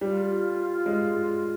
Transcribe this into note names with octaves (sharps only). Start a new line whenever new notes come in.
G3 F4
G#3